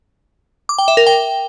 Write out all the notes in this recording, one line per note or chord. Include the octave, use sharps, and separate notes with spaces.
D6
G5
E5
A#4
G5